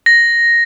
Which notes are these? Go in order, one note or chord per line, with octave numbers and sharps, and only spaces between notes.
A#6